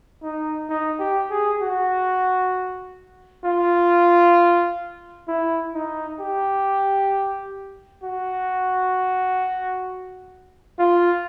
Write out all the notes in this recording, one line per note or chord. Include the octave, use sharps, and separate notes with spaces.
D#4
D#4
G4
G#4
F#4
F4
E4
D#4
G4
F#4
F4